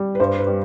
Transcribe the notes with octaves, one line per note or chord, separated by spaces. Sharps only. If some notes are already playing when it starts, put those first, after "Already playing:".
Already playing: G3
B4
G2 C5
B4
G3